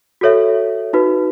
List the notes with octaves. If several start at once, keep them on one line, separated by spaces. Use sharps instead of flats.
F#4 A4 C#5 E5
D#4 F#4 B4